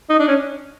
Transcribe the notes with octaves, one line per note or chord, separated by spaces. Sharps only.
D#4
D4
C#4